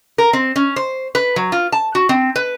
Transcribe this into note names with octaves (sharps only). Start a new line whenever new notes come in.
A#4
C4
C#4
C5
B4
F#3
F4
A5
F#4
C4
B4